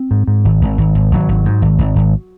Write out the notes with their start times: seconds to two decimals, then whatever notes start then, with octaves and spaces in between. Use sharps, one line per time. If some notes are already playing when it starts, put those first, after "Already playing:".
Already playing: C4
0.11 G#2
0.27 G#2
0.45 G#1
0.61 G#1
0.78 G#1
0.95 G#1
1.12 G#1 F#3
1.29 G#1
1.45 G#2
1.62 G#1
1.78 G#1
1.96 G#1